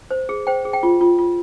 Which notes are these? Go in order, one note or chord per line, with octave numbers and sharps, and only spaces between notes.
C5
G#4
C5 G5
G#4
G5
F4
F4
F4